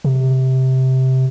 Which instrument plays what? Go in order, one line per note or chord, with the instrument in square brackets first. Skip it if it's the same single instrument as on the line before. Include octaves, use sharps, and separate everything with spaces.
[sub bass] C3